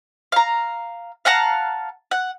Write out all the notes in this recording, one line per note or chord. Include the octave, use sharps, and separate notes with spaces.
F5 A#5
F5 F#5 A5 A#5
F#5